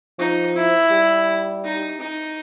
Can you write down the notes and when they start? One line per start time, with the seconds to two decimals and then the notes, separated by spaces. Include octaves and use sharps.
0.19 F3 D#4
0.56 E4
0.91 G3
1.64 D#4
2.00 D#4